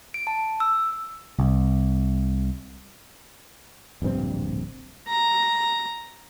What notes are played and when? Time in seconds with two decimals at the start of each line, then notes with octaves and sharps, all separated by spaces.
0.14 D7
0.27 A5
0.60 E6
1.39 C2
4.02 D1 A#1 G2 C4
5.08 A#5